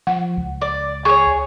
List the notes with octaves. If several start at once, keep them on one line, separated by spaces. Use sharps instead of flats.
F3 F#5
C#2
D5
G#4 C#5 C#6